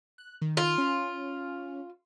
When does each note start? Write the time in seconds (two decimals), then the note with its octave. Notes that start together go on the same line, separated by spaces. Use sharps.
0.18 F#6
0.42 D#3
0.57 F4
0.78 C#4